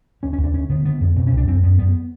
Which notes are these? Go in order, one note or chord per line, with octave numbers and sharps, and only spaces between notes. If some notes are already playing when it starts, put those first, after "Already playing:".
D#2 C#4
C#4
D#2
D4
D2 C#4
D3 B3
D3 B3
F2 B3
B2 C4
C#4
C2
D4
F#2 C4
F#2 B3
F#2 B3